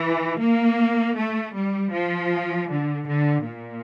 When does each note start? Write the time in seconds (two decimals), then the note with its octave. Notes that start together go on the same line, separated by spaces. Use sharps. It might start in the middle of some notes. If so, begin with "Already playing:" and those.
Already playing: E3
0.40 A#3
1.16 A3
1.54 G3
1.93 F3
2.69 D3
3.08 D3
3.46 A#2